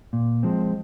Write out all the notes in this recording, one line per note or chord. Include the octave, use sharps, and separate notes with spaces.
A#2
F3 G#3 C4